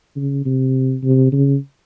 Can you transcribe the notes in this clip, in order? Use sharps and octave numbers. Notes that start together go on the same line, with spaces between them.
C#3
C3
C3
C#3